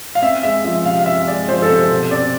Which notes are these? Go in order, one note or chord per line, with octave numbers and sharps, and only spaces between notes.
F5
C4 E5
G#3 E5
F3 E5
C3 F5
F5
C4 E5
G#3 D5
F3 C5
A4
C3
C5
B2
C4 D5